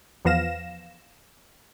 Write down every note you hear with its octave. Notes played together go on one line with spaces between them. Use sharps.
E2 F3 B3 F5 A#6 E7